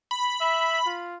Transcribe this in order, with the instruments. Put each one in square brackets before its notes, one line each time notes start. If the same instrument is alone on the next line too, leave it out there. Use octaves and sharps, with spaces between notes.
[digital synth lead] B5
[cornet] E5
F4